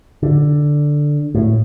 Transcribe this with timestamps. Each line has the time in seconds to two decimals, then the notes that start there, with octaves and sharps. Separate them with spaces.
0.23 D3
1.35 A2